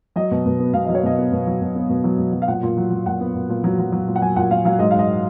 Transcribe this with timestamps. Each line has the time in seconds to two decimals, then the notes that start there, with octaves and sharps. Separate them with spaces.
0.16 F#3 D#5
0.31 B2
0.46 B2
0.60 B3
0.74 B2 F5
0.85 F#3 D#5
0.95 C#5
1.03 B2 D#5
1.18 B3
1.32 B2
1.47 F#3
1.61 B2
1.76 B3
1.89 B2
2.04 F#3
2.18 B2
2.33 F#3
2.42 F5
2.47 A#2 F#5
2.63 A#2
2.77 F#3
2.91 F#3
3.06 A#2 F#5
3.20 B3
3.35 A#2
3.49 A#2
3.64 F#3
3.79 F#3
3.92 F#3
4.08 A#2
4.16 F#5
4.22 F#3 G#5
4.36 A#2 F#5
4.50 A#2 F5
4.65 F#3 F5
4.79 G#2 D#5
4.91 G#2 F5
4.99 D#5